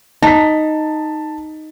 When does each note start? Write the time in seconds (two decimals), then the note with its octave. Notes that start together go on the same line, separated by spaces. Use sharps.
0.23 D#4 A5 B6